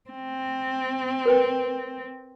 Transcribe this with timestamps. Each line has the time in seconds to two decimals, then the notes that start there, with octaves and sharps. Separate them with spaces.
0.10 C4
1.26 A#4 B4 G5